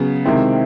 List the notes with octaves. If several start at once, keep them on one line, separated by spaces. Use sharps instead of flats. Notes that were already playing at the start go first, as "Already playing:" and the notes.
Already playing: C#3 F#3 B3
C3 D#3 G#3 C4 E4